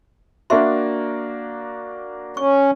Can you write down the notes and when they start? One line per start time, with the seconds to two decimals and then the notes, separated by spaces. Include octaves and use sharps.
0.50 A#3 D4 F#4 E5 C6
2.37 C#4 C#6